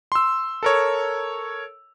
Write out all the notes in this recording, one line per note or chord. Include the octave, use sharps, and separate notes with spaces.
C6 E6
A4 A#4 C#5